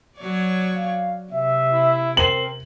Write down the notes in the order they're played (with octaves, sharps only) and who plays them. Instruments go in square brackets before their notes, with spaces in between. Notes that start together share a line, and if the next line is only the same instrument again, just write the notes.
[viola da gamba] F#3 C#5 D5
[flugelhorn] F5
[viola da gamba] C3 [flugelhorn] E5
[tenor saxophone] E4
[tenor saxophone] C4 [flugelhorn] A#4 [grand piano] F#7